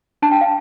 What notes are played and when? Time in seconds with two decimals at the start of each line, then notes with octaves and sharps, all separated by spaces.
0.22 D4 A5
0.31 G5
0.41 F5